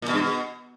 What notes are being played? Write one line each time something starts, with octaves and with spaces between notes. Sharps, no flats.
A#2
B2
G2
B2